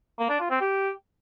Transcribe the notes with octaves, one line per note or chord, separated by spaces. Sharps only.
A#3
D4
F4
C4
G4